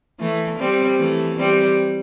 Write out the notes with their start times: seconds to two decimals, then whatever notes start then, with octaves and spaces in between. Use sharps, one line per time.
0.20 E3 A3
0.59 G3 C4
0.99 E3 A3
1.38 G3 C4